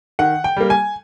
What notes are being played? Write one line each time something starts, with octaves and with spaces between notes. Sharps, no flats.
D#3 F#5
G5
G3 A#3
G#5